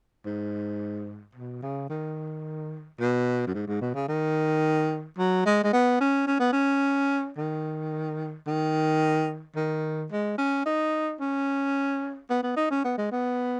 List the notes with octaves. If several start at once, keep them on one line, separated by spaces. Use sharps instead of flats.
G#2
B2
C#3
D#3
B2
F#2
G#2
G#2
B2
C#3
D#3
F#3
G#3
G#3
B3
C#4
C#4
B3
C#4
D#3
D#3
D#3
G#3
C#4
D#4
C#4
B3
B3
D#4
C#4
B3
G#3
B3